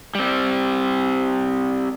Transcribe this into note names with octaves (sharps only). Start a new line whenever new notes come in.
G3 C4